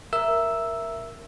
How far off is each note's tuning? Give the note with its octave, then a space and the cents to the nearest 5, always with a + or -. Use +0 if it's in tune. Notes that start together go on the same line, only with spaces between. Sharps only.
A#4 +0 E5 +10 E6 +0